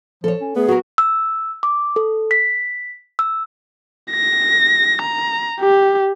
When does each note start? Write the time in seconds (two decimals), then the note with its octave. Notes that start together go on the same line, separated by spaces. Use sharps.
0.24 F3 A4 C#5
0.41 C#4
0.56 A3 B3 G#4
0.68 F#3 F#4 A#4
0.98 E6
1.63 D6
1.96 A4
2.31 B6
3.19 E6
4.12 A#6
5.02 A#5
5.61 G4